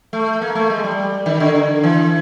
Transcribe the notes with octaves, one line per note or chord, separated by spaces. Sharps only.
A3
A#3
A3
G#3
G3
D#3
D3
D3
E3